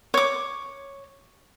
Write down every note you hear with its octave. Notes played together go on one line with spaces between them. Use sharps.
C#5 D6